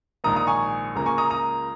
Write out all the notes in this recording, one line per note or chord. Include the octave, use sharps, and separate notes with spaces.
A#1 G#2 D#3 A#3 A#5 D#6
A#5 D#6
G#5 C#6
C#2 C#3 A#3 A#5
G#5 C#6
A#5 D#6
A#5 D#6